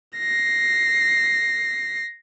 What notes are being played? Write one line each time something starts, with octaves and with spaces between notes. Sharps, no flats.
A#6 C7